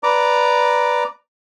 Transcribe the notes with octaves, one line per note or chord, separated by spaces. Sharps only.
B4 D5 A#5 D6